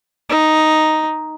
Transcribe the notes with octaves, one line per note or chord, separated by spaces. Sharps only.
D#4